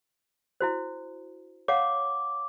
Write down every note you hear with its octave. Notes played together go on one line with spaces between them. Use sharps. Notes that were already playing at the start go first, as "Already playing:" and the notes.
E4 F#4 C5
C#5 F5 F#5 D6